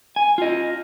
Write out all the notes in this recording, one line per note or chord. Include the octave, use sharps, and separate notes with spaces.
G#5
F4 D#5